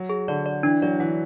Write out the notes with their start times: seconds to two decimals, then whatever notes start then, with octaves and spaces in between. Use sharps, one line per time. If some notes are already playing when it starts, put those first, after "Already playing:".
Already playing: F#3
0.10 G#4
0.28 D3 D5
0.46 D5
0.63 E3 D4
0.82 F#3 D5
1.00 E3 F#5